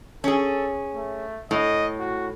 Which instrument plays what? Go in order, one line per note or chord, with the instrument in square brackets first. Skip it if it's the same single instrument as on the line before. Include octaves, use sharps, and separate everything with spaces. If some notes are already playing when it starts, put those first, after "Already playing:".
[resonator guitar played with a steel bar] C#4 G#4 [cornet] A4
[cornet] A3
[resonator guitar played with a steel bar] A2 [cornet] D#5
[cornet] F#4